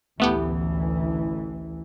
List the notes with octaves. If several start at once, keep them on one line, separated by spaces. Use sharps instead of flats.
A1 D2 E3 A3 B3 G4